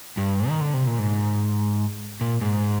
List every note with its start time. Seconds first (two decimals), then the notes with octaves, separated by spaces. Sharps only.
0.17 G2
0.49 D#3
0.61 D3
0.74 C3
0.87 A#2
0.99 G#2
2.21 A#2
2.41 G#2